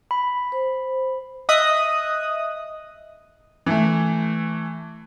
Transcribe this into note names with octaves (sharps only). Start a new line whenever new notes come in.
B5
C5
D#5 E5 D#6 F#6
E3 A3